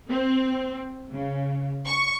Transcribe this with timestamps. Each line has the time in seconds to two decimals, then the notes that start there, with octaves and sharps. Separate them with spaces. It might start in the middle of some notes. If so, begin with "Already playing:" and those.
0.10 C4
1.11 C#3
1.86 C#6